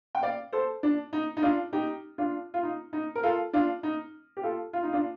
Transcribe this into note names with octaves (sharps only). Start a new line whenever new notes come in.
G5
D5 F5
A4 C5
D4
D#4
D#4
D4 F4
D#4 G4
D4 F4
F4
D#4
D#4
A#4
F4 A4
D4 F4
D#4
G4
F4 A4
F4
D#4
D4 F4